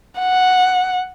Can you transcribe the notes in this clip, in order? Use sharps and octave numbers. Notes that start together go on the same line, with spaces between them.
F#5